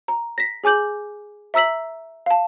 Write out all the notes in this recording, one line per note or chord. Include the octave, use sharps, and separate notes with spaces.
A#5
A#6 B6
G#4 G#5 D6 G6 F#7
E5 A#5 E6 B6 F#7
F5 A5